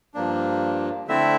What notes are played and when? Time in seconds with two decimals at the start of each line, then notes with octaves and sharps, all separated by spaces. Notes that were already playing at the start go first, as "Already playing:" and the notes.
0.14 G2 F3 A#3 D4
1.08 D3 A3 C4 E4 E5